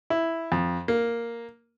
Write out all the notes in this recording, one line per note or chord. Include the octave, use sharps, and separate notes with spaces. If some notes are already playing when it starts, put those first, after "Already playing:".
E4
F2
A#3